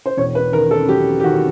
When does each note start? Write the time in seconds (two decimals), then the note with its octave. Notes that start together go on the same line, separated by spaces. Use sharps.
0.06 C5
0.17 E1 C#5
0.35 B4
0.53 D#3 A#4
0.71 A4
0.89 F#3 G4
1.20 G4
1.24 D#3 F#4